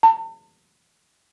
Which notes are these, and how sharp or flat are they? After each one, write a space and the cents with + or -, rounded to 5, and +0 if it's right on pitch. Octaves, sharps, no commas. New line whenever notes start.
A5 +40